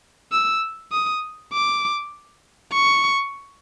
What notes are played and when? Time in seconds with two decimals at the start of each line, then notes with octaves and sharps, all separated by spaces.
0.32 E6
0.92 D#6
1.53 D6
2.73 C#6